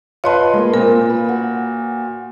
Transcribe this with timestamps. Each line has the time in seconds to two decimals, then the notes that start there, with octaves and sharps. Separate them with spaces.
0.24 F4 B4 C#5 D#5 A5 C6
0.53 G#3 A#3
0.74 A#2 C4 F4 A#4
1.09 B4
1.29 F#4